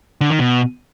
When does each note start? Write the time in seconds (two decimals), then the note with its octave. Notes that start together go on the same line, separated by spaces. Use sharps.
0.21 D3
0.30 D#3
0.40 B2